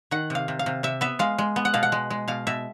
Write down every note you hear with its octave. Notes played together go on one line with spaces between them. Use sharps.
D#3 F#5
C3 F5
C3
F5
C3
C3 E5
B3 E5
G#3 F5
G#3
B3
F#5
B2 F5
F#5
G#3
G#3
B2 F5
B2 E5